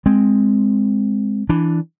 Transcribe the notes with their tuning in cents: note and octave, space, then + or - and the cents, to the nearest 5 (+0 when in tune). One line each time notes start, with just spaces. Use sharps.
G#3 +0 C4 +0
E3 +0 D4 +0